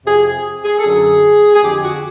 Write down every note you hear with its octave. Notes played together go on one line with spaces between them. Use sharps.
F2 C3 F3 G#4
G#4
G#4
A4
F#2 D3 F#3 G#4
G#4
F2 D3 F3 G4
F#4